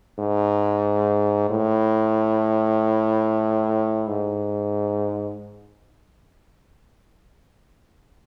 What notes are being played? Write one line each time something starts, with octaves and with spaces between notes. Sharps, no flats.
G#2
A2
G#2